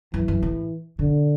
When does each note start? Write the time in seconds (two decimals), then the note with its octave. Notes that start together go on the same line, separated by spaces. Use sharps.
0.14 F#2 E3
0.28 F#2
0.43 A2
0.99 B2 D3